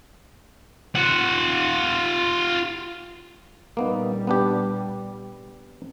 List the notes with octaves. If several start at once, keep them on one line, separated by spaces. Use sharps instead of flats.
F4 F#5
A#2 G3 A#3 B3 D#4
B3 D4 G4